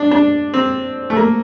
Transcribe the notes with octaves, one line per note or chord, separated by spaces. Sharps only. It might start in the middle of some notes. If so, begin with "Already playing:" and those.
Already playing: D4
D4
C4
A3
A#3